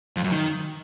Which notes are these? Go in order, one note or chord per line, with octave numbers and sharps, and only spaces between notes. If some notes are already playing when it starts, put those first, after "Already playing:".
F2
F#2
D#3